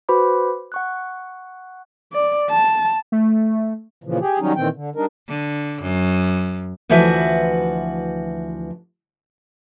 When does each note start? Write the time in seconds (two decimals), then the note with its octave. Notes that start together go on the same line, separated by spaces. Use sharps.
0.09 F#4 B4 C5 B5 D6
0.72 F#5 C#6 F#6
2.13 D5
2.50 A5
3.12 A3
4.04 A#2 C#3 E3 F3
4.20 G4 G#4
4.39 D#3 F#3 G3 C#4 D#4
4.56 A#2 D#3 E3 C4 G5
4.74 D3
4.96 G3 D4 D#4 A#4
5.29 D3
5.82 F#2
6.89 D2 E3 F3 F#4 B4 E5